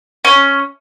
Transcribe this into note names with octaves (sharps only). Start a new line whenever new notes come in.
C#4